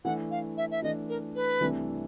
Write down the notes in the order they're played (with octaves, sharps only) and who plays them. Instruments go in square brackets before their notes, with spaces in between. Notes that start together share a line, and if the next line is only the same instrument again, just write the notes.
[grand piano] E3 A3 D4 [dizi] F#5
[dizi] F5
E5
E5
[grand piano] E3 A3 D4 [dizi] D#5
[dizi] A#4
B4
[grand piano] C2 C3 E3 A3 D4